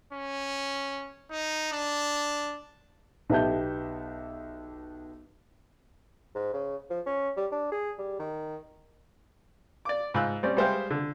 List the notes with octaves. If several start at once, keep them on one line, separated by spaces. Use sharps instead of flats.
C#4
D#4
D4
B1 B3 G4 E5 A5 G6
G#2
C#3
F3
C#4
G3
D4
G#4
G3
D#3
D5 D6
G#2 F4 B5 E6 F#6
G3 C4 C#4 D5
G3 G#3 C5 E5 F5 G5
D3